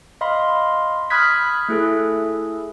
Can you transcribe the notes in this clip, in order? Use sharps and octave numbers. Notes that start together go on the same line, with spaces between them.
D#5 F5 B5 C6
B5 D#6 F6 F#6 G#6 B6
A3 E4 G#4 A4